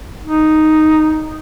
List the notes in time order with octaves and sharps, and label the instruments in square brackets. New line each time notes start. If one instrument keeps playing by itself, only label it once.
[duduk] D#4